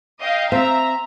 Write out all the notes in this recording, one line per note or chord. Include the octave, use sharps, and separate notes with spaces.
D#5 F5 G5
C4 E5 A#5